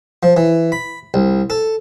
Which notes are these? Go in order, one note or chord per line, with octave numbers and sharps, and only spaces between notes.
F3
E3
B5
C2
A4